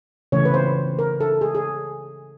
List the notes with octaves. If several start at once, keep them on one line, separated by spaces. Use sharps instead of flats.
C#3 E3 A3 C#4 C#5
B4
C5
A#4
A4
G#4
G#4